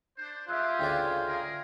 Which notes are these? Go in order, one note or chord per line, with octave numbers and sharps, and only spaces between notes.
D4 C5
F4 G4 G#4 E5 E6 F#6
D2 C#3 D5 G5
G#4 A#4